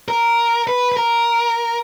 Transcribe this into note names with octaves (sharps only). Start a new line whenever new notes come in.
A#4
B4
B4
A#4